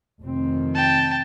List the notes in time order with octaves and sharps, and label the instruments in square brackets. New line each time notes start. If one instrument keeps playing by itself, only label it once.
[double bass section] F1 D#3 C4
[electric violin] G5 A5